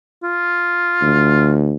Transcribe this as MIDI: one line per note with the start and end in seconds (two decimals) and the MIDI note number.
0.23 1.54 65
1.02 1.75 38